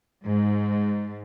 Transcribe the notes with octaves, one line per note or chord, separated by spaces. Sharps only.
G#2